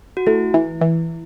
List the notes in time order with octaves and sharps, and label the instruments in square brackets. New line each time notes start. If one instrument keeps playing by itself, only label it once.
[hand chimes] F#4
[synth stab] A3 [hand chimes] E4
[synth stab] E3
E3